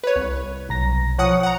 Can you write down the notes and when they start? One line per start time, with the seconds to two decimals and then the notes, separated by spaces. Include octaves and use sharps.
0.04 B4 C#5
0.16 C2
0.69 B1 A#5 A#6
1.18 F3 C#5 F#5 D#6
1.43 F#5 A#5